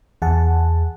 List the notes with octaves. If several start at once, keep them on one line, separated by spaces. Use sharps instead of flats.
E2 G#4 F#5 A5